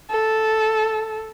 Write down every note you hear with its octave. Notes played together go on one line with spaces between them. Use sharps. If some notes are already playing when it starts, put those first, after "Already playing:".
A4